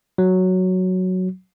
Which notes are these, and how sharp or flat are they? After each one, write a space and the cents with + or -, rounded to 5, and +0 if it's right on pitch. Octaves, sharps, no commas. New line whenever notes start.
F#3 +0